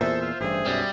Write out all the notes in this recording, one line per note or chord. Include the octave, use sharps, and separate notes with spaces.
E2 A#2 A4 C5 E5 E6
F4
A1 G2 G#4
B1 F#2 G3